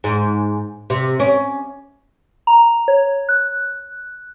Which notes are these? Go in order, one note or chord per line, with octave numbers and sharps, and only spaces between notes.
G#2
C3
C#4
A#5
C#5
F#6